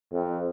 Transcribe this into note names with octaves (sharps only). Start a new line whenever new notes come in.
F2